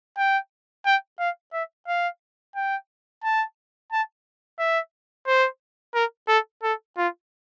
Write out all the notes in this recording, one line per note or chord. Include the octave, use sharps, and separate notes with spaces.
G5
G5
F5
E5
F5
G5
A5
A5
E5
C5
A#4
A4
A4
F4